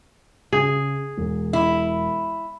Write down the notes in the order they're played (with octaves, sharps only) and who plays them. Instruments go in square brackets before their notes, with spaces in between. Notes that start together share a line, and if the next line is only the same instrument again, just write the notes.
[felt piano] C#3 [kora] G#4
[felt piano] E1
[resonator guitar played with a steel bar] E4